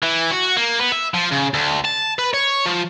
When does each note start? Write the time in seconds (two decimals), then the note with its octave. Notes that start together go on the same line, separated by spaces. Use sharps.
0.03 E3
0.31 F#4
0.57 A#3
0.80 B3
0.92 E5
1.14 F3
1.32 C#3
1.54 D2
1.85 A5
2.19 B4
2.34 C#5
2.66 F3